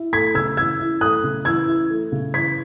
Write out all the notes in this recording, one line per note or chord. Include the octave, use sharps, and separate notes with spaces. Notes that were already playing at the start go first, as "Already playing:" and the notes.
Already playing: E4
A3 G#6 B6
C#3 E6 G#6
E3 E6 G#6
E4
A3 D#6 F#6
C#3
E3 E6 G#6
E4
A3
C#3
E3 G#6 B6